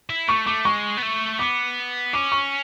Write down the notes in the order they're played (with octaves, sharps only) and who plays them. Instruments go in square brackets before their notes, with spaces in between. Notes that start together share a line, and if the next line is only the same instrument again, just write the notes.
[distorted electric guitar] E4
[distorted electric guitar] A3 [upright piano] C#6
[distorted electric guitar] A3 [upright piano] D6
[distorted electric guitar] G#3 [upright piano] C#6
[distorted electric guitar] B3
A3
[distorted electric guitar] B3 [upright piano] D6
[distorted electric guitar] C#4 [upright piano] D6
[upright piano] C#6